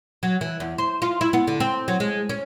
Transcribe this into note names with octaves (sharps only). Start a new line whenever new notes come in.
F#3
E3
E2
C5
F4
E4
B3
D3
C4
F#3
G#3
C#4